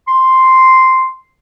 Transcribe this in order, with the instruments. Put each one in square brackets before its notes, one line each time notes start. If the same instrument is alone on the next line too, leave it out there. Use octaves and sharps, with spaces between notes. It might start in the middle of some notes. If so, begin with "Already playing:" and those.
[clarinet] C6